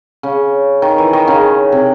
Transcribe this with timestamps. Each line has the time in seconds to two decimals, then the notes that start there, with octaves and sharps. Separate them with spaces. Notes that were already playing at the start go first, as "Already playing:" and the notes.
0.23 C#3
0.82 D#3
0.98 E3
1.13 D#3
1.27 C#3
1.72 C3